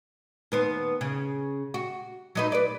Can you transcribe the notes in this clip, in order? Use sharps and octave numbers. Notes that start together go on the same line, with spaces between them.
D#2 B3 C5
C#3
F#4
F#3 D#4 B4
B4 D5